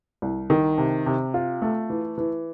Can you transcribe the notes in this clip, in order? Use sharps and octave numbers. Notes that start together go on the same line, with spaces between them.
C2
D#3
C3
C3
F4
A3
E3
E3